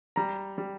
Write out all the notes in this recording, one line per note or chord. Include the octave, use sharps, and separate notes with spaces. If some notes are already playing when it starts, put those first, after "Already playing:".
G3 A#5
G3